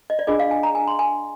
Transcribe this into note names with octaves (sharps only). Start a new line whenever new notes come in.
D#5
D5
D4 F4 G#4 D#5
F5
G#5
A#5
G#5
C6
G#5